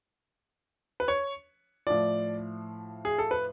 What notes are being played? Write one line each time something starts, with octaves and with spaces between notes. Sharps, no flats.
B4
C#5
A2 F3 D5
G#4
A4
B4